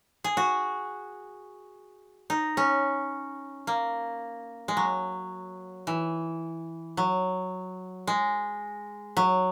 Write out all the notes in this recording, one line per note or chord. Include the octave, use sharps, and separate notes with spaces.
G#4
F#4
D#4
C#4
A#3
G#3
F#3
E3
F#3
G#3
F#3